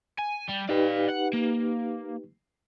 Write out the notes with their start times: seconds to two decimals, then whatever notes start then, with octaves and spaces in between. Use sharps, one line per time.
0.19 G#5
0.48 G3
0.69 D#4 G4 B4 D5 F5
1.09 F#5
1.33 A#3